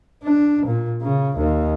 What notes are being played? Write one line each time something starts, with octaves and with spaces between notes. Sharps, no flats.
D4
A#2
C#3
D#2